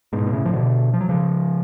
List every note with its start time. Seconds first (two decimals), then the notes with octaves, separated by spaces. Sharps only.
0.13 G#2 B2
0.26 B2
0.33 A2 C#3
0.45 F3
0.53 B2 D3
0.94 F3
1.01 F#3
1.09 C#3 F3